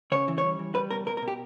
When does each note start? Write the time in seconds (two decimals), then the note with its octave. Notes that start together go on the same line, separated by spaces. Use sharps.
0.12 C#3 C#5
0.28 E3
0.38 C#5
0.44 G3
0.59 E3
0.75 G3 B4
0.91 B2 A#4
1.06 B2 A#4
1.17 A#4
1.22 B2
1.28 G4